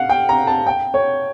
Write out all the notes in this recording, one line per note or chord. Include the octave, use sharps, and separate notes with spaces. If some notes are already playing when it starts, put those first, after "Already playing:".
Already playing: F5 F#5
G5
A#5
A5
G5
C#5